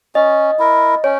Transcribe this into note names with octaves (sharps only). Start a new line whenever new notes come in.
C#4 D#5
E4 A#4
C#4 C#5